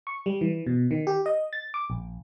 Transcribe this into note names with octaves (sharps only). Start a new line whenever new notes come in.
C#6
G3
E3
B2
D#3
G4
D#5
A6
D6
A#1